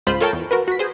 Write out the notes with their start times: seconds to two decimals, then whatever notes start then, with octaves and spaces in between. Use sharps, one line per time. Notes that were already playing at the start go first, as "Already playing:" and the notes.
0.07 C#2 G#2 F4 C5 B5
0.20 F4 A4 A#4 C#5 G5 A5
0.33 E2
0.51 F#4 A#4 B4
0.68 F#4 B6
0.79 G#4 C5